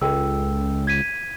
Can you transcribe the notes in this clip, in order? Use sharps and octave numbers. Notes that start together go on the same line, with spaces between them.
C#2 A4 G5 E6
G#6 B6 D#7